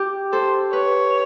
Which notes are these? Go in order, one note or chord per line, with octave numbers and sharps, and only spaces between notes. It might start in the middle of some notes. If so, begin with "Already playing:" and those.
Already playing: G4
A4 C5
B4 C#5